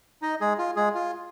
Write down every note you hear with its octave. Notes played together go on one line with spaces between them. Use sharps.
D#4 D#5
G#3 G#4
F4
G#3 G#4
F4